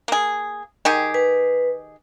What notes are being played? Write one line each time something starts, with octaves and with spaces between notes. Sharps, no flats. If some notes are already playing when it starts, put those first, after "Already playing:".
A#3 G#4
D#3 G4 G#4
B4